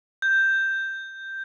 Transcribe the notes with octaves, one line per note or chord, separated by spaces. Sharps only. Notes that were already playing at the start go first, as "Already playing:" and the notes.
G6